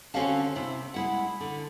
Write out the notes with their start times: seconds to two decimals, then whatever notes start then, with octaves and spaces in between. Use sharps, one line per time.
0.14 D3 C4 C#4 F#4 F5 A5
0.56 C3 E4
0.94 G#3 E4 F#5
1.40 D3